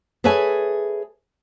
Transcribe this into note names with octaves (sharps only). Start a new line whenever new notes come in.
G#4 A4 B4 C#5 E5 G#5